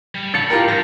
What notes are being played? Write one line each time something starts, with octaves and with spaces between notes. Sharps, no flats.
G3
A4 A5 B5 A6 C#7
F4 G4 A#4
G2 A#6